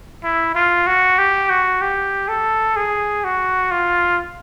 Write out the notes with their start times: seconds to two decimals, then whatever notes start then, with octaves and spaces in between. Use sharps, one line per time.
0.23 E4
0.55 F4
0.87 F#4
1.18 G4
1.50 F#4
1.81 G4
2.28 A4
2.76 G#4
3.24 F#4
3.71 F4